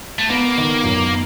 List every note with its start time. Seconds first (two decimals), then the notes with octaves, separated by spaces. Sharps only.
0.19 A3
0.30 A#3 B3
0.58 D#3
0.84 F#2